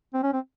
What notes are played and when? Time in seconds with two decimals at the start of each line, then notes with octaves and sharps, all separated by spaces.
0.14 C4
0.23 C#4
0.33 C4